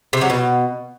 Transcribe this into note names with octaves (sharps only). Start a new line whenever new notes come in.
C3
F#3
B2